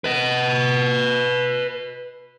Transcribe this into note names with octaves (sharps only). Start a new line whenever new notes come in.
B4 D#5